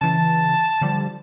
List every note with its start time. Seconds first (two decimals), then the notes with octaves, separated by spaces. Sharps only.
0.01 C#3 E3 A5
0.81 D3 F3 G3